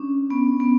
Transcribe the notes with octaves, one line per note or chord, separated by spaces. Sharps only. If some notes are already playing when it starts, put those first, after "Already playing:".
Already playing: C#4 D4
B3
B3